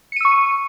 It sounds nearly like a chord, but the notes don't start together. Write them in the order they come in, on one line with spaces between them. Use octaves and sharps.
C#7 D#7 E6 C#6